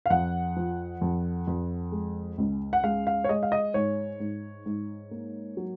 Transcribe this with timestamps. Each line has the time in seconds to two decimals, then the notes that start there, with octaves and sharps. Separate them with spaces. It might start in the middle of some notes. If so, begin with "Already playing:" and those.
0.06 F5
0.10 F2 F#5
0.56 F3
1.01 F2
1.47 F2
1.92 G#3
2.38 C#2
2.73 F#5
2.84 G#3 F5
3.07 F5
3.24 C#5
3.29 G#3 D#5
3.43 F5
3.52 D#5
3.74 G#2 C#5
4.20 G#2
4.66 G#2
5.11 A#3
5.57 F#3